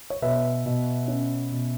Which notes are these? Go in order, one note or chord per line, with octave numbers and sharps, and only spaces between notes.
C#5
B2 B4 E5
B2
C#4
B2